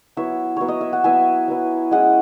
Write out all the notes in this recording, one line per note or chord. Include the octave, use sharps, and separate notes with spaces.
F#3 B3 E4 C#5 E5
F#3 B3 E4 C#5
D#5
E5
F#5
F#3 B3 E4 E5 G#5
F#3 B3 E4
G#3 C#4 E4 D#5 F#5